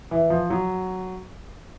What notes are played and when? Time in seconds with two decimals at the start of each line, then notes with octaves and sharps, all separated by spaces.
0.11 E3
0.30 F3
0.50 F#3